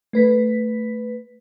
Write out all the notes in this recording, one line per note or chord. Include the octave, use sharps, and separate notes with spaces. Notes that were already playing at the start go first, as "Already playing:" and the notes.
A3 B4 B6